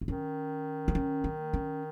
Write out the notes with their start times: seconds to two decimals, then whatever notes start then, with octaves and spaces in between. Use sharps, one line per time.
0.01 A#3
0.08 D#3 C#4
0.88 A#3
0.95 C#4
1.24 A#3
1.53 C#4